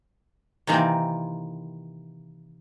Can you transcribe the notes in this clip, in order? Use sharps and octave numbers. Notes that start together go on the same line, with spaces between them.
C3 D#3 E3 A#3 C4